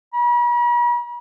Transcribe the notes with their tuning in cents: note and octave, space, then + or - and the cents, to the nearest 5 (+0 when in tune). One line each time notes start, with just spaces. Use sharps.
B5 -45